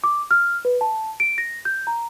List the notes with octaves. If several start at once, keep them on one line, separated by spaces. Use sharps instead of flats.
D6
F6
B4
A5
D7
A#6
G6
A#5